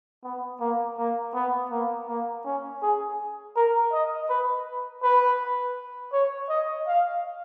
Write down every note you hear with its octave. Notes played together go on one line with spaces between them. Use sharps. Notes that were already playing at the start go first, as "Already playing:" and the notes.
B3
A#3
A#3
B3
A#3
A#3
C#4
G#4
A#4
D#5
B4
B4
C#5
D#5
F5